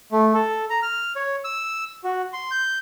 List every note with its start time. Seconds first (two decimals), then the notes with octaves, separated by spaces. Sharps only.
0.12 A3
0.34 A4
0.70 A#5
0.82 F6
1.16 C#5
1.44 E6
2.04 F#4
2.33 C6
2.51 G6